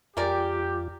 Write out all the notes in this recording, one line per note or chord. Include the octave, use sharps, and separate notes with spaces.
F2 G#3 F4 G4 A#4 D5